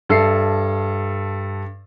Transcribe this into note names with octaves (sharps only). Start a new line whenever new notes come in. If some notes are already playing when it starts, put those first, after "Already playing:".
G2 A4 E5 C7